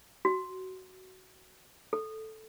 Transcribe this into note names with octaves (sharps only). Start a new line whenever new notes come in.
F#4
A4